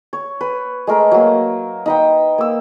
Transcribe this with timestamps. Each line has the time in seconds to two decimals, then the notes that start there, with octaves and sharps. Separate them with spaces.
0.13 C#5
0.41 B4
0.87 G#3 A3 A#4
1.11 F#3 A#3
1.86 D#4 B4 G5
2.38 A#3 E6